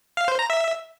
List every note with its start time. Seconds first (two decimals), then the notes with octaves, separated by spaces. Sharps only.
0.17 F5
0.28 C5
0.39 A#5
0.50 E5